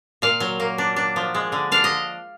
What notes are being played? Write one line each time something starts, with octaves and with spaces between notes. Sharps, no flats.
A#2 F5
F#3
A#3
D4
D4
F3
G#3
D3
D4 F5
D#5